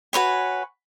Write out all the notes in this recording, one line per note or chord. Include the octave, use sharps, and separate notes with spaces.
F#4 B4 C#5 G#5